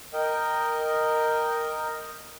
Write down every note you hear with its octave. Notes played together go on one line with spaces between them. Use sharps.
A#4 D#5 G5